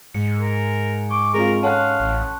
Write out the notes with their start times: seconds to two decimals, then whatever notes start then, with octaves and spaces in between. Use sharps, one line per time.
0.14 G#2 C#7
0.39 A#4
1.11 C#6 D6
1.34 G#3 C4 F4 A#4
1.63 C#4 A4 F5 F#5 A5 C6 F#6
2.00 A1